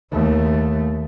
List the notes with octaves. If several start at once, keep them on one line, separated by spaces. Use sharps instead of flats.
D#2 A3